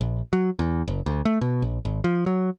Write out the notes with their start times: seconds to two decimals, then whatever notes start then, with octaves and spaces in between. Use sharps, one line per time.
0.01 A#1
0.33 F#3
0.59 E2
0.88 F#1
1.06 D2
1.25 A3
1.41 B2
1.62 A#1
1.85 G#1
2.04 F3
2.26 F#3